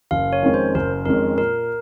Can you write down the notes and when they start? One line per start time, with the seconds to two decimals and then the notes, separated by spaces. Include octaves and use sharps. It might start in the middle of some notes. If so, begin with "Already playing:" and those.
0.11 F#1 F5
0.33 C#5
0.42 F2 D#3 G#3 C#4
0.54 C5
0.75 F#1 A#4
1.05 F2 D#3 G#3 C#4 A#4
1.37 A#2 A#4